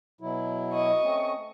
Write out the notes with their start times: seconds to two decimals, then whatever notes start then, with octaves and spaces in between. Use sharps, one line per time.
0.21 B2 F#3 E4
0.73 D#5 C#6
1.03 A3 C4 C#4